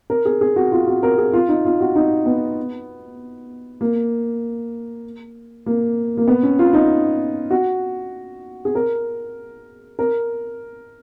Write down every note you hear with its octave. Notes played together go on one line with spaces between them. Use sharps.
A#4
G#4
G#4
F#4
F4
F#4
A#4
G#4
F4
D#4
F4
F#4
D#4
B3
A#3
A#3
A#3
B3
C#4
F4
D#4
F#4
G#4
A#4
A#4